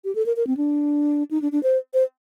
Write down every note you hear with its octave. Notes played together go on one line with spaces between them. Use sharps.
G4
A4
A#4
A#4
C4
D4
D#4
D4
D4
C5
C5